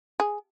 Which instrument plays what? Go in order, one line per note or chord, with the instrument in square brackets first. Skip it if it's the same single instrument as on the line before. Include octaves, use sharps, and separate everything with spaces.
[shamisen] G#4